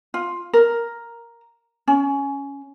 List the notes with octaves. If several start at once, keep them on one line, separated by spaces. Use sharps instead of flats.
F4
A#4
C#4